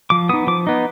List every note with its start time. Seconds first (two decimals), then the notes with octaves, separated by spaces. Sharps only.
0.10 F3 D6
0.29 B3 D#6
0.33 D#4
0.47 F3 D6
0.67 B3 D#4